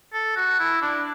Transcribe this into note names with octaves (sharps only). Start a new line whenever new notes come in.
A4
F#4
E4
D4